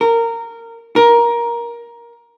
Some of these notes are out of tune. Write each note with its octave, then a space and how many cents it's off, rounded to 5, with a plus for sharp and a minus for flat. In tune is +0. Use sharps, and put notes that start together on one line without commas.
A#4 -15
A#4 +15